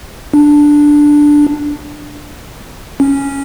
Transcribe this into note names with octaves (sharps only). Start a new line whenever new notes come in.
D4
C#4